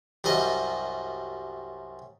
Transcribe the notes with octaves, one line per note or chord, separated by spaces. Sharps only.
C2 F#2 G3 D#5